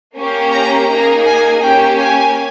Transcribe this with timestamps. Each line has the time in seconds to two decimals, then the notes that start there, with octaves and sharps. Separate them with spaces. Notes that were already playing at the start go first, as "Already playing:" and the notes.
0.16 A#3 C#4 G4
0.52 A#5
0.89 A#3 D#4 G#4 A#5
1.26 G#5
1.62 A#3 C#4 G4 G5
1.99 G#5